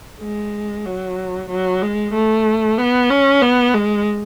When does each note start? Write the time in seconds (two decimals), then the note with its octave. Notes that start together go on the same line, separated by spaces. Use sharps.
0.21 G#3
0.85 F#3
1.49 F#3
1.82 G#3
2.14 A3
2.78 B3
3.10 C#4
3.42 B3
3.74 G#3